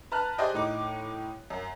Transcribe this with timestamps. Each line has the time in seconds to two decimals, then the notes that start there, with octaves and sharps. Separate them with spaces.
0.12 B4 A5 A#5 F6 F#6
0.38 G4 G#4 C5 D5 D#5 G5
0.54 A2 D#4 D6
1.50 F#2